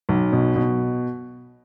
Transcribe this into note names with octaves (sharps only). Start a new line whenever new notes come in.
B1
B2
B2